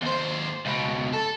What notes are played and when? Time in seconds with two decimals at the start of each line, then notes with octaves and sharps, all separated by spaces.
0.02 D#2 C5
0.66 C#2 B2
1.14 A4